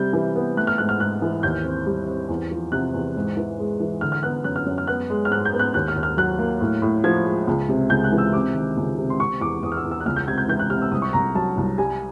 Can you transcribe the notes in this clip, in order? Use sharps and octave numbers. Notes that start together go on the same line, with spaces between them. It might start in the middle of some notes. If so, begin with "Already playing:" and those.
Already playing: C3 G3 G6
E3
B3
A3 F#6
F6
G#2 F#6
F6
G#2 F#6
E3
D#2 G6
C4
G3
C4
E2
F3
C3 F#6
E2
G#2
E3
G#3
E3
D3 F6
F6
B3 F#6
F#2 F#6
F6
F#2
F6
B3 F#6
G#3
F6
G#2 F#6
G6
B3
F#6
D#2 F#6
F6
D#2
F6
F#3 F#6
A#3
A2
A2
F3 G#6
G#3
C#2
C3
C#2 G6
F#6
E3
E6
C3 D6
D#3
C#2
C3
C6
C3 C#6
E2 D6
E2 D#6
F6
E6
E2
E6
F#6
C#2 F6
G6
C3 G#6
G6
E3 G6
F#6
C3 F6
E6
C2 D#6
C#6
C2 A#5
F#3 A5
C2
G3 G#5